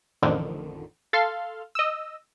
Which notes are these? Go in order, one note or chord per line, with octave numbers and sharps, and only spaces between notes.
A1 F2 D3 D#3
A4 F5 C6 F6
D#5 E6